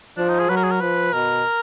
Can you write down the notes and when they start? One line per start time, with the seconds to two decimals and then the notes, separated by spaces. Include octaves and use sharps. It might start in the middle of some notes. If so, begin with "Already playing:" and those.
0.17 F3 D4
0.29 D#4
0.39 G#4
0.49 F#3 B4
0.57 A#4
0.63 G#4
0.71 A#4
0.81 F3 B4
1.13 B2 A#4